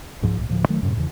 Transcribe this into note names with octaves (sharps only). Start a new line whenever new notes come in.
C#2 G#2 F3
C2 A2
D2 A2 F3
D#3 F#3 A3
F#2 A2 C3
E2 C#3 E3